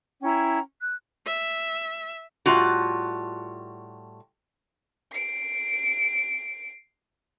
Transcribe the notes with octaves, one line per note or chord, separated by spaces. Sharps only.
C#4 E4 G5 A#5
F#6
E5
A2 G3 F4 F#4
C7 D7